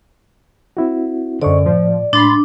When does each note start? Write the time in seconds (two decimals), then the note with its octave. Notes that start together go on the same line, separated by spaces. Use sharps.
0.77 C4 E4 F#4
1.42 F#2 D3 C5 D5 D#5 C#6
1.66 A2 F3
2.13 A2 G#3 D4 B5 C6 A6